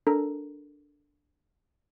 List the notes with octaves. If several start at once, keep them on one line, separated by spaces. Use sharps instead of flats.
D4 A4 A#4 A#5